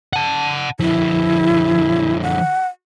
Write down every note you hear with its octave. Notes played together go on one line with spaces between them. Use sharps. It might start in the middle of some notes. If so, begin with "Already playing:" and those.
F#5 A5
D3 F3 E4
F#5